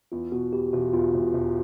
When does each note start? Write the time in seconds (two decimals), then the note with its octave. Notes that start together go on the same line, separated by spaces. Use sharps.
0.12 E2 F4
0.32 B2 F#4
0.52 E2 G4
0.73 E1 F#4
0.93 E2 F4
1.14 E1
1.34 E1